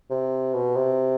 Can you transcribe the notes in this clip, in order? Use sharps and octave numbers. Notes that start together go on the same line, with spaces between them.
C3
B2
C3